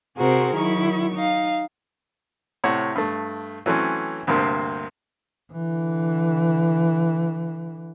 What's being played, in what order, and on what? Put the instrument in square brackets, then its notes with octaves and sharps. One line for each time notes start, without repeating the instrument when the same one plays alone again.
[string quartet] C3 C4 F#4 G#4 A#4 C5
D#3 F#3 E4 C#6
D#4 F5
[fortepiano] A2 C3 C#5 F#5
G2 A3
E3 F#3 A3 C4 C#4
D2 G2 C3 A#3 C4
[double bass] D3 E3